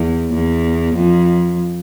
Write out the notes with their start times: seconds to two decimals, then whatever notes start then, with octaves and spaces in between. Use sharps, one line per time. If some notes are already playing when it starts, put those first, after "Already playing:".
Already playing: E2
0.33 E2
0.96 F2